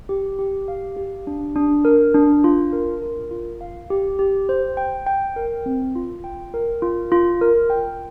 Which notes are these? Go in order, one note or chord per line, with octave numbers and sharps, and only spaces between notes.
G4
G4
F5
G4
D4
D4
A#4
D4
F4
A#4
A#4
F4
F5
G4
G4
C5
G5
G5
A#4
C4
F4
G5
A#4
F4
F4
A#4
G5